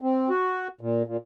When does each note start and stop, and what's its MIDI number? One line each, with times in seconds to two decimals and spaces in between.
0.02 0.29 60
0.30 0.68 66
0.81 1.03 46
1.07 1.17 46